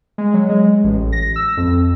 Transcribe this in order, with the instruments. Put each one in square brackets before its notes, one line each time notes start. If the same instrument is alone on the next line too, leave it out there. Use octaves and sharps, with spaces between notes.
[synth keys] G#3
F#3
G#3
A1
A#6
E6
F2